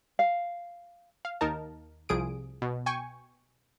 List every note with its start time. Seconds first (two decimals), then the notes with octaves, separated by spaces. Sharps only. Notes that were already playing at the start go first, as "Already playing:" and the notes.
0.19 F5
1.25 F5
1.41 D#2 D#4 A#4 A5
2.09 C2 F3 G#4 D#6 D7
2.62 B2
2.86 G5 G#5 C#6